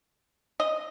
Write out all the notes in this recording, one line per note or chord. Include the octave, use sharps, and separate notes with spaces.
D#5